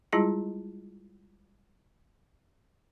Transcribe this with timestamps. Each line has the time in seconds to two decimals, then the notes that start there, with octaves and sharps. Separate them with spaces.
0.13 G3 G#3 E4 F4 G#4 A5